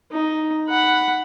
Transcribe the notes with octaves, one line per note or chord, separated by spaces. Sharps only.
D#4
F#5 B5